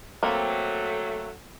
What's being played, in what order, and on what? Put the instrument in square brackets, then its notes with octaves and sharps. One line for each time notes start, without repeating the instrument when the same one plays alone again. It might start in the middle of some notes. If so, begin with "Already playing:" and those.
[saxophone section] F#3 A3 [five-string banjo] A#3 C4